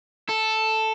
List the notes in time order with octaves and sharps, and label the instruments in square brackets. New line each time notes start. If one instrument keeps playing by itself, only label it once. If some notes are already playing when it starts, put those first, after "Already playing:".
[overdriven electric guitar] A4